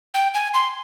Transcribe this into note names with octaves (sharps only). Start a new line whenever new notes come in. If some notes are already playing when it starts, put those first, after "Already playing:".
G5
G#5
C6